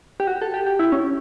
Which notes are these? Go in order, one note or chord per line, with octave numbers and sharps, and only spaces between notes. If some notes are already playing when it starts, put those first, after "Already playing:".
G4
F#4
A4
G4
G4
E4
C#4